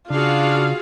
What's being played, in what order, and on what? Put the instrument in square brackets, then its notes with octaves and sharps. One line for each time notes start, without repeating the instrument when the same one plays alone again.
[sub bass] C#3 [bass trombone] D4 [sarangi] F4 [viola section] F#4 G#4 F5